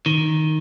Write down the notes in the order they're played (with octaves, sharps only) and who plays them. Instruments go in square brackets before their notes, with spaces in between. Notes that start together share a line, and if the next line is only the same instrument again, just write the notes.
[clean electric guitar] D#3